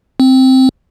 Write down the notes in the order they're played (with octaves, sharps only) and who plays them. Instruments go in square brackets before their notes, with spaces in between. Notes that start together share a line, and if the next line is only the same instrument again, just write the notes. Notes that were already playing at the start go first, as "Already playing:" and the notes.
[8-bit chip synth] C4